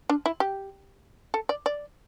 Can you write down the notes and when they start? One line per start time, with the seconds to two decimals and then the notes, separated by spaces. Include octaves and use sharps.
0.10 D4
0.26 E4
0.40 G4
1.34 A4
1.49 D5
1.66 D5